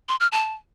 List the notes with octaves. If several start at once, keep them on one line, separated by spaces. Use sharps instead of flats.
C6
F6
A5